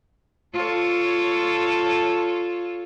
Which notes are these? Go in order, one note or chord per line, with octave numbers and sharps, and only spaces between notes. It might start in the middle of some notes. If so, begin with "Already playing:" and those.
F4 A4 C#5